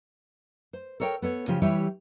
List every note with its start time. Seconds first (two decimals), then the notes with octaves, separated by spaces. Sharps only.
0.73 C5
1.00 A4 A#4 C#5 E5 G5
1.22 B3 A4 C#5
1.48 C#3 F3 F4 G4
1.62 E3 G3 E4 G4 C#5